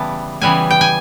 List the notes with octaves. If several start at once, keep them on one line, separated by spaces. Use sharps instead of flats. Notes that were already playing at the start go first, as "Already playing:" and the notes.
Already playing: C#3 E3 G3 B3 E4 A5
C#3 E3 G3 B3 E4 G#5
G5
G#5